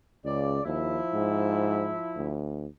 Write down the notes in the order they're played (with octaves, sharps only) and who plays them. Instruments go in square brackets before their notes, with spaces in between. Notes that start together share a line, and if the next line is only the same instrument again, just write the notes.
[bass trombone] C#2 [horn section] C#3 D5
[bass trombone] D#2 [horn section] F3 E4
[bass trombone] G#2
D2